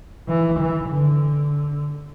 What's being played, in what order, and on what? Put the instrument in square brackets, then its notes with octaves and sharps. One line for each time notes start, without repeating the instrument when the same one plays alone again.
[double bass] E3
E3
D3